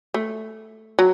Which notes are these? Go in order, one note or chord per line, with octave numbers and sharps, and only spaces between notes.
A3
F#3